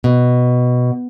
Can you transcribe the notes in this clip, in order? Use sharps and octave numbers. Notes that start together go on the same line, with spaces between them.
B2